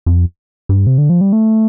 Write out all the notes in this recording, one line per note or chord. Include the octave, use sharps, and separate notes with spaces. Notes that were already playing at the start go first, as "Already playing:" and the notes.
F2
G2
C3
D3
F3
G3
A3